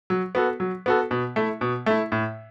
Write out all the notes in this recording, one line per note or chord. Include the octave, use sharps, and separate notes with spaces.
F#3
B3 F#4 A4
F#3
B3 F#4 A4
B2
A3 E4
B2
A3 E4
A2